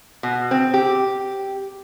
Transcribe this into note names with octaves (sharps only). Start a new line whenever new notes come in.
B2
C4
G4